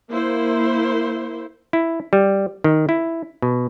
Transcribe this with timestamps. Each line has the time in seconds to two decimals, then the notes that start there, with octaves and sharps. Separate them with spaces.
0.10 A#3 E4 C5
1.73 E4
2.13 G3
2.64 D#3
2.89 E4
3.42 B2